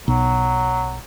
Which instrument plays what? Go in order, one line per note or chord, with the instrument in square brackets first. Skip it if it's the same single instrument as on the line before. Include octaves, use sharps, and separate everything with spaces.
[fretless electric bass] B1 [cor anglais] F#3